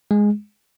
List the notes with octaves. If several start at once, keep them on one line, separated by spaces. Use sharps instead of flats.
G#3